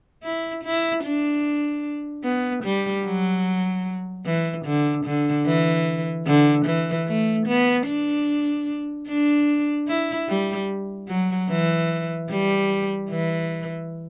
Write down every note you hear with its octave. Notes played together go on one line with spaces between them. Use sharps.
E4
E4
D4
B3
G3
F#3
E3
D3
D3
E3
D3
E3
A3
B3
D4
D4
E4
G3
F#3
E3
G3
E3